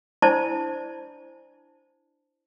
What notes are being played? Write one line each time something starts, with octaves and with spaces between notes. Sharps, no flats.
D4 E4 C5 D5 A5